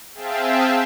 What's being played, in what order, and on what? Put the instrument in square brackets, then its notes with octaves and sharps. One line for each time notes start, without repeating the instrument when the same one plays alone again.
[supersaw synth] C4 G#4 E5 F5 G5 A5